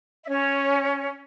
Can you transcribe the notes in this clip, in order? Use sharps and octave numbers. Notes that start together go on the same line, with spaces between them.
E5
C#4 C#5